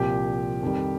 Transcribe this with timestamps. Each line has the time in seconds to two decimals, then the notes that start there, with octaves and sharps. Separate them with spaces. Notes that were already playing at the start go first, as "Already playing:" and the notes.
Already playing: C2 A#2 F3 G4
0.63 F2 D#3 G3